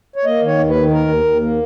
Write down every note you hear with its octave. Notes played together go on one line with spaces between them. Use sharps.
C#5
A#3 D#5
D#3 C#5
D#2
B4
D#3
D#2 A#4
D#2
D#2
A#3